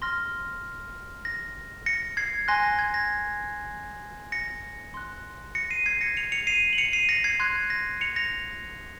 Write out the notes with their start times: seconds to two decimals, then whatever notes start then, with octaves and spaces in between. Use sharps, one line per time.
0.02 C6 F6 A#6
1.25 A#6
1.86 A#6 C#7
2.17 G#6 C7
2.48 G#5 C6 F#6 A#6
2.63 A#6
2.79 G#6
2.94 A#6
4.32 A#6 C#7
4.94 C6 F#6
5.55 A#6 C#7
5.70 C7 D#7
5.86 G#6 C7
6.01 A#6 C#7
6.17 C#7 F7
6.32 C#7 F7
6.47 C7 D#7
6.73 F#7
6.78 C#7 F7
6.93 C7 D#7
7.09 A#6 C#7
7.24 G#6 C7
7.40 C6 F#6 G#6
7.70 A#6
8.01 C#7 F7
8.16 A#6 C#7